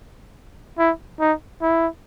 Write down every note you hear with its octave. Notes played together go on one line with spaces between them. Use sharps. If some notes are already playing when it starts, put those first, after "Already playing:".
E4
D#4
E4